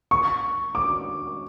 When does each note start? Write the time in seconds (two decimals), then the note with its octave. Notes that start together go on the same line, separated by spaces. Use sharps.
0.11 C#6
0.75 D6